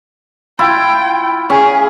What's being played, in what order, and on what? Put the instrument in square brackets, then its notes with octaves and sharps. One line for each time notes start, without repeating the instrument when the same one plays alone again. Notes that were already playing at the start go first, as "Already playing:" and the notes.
[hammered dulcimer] E4 F4 [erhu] G5
[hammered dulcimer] C#4 [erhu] G#4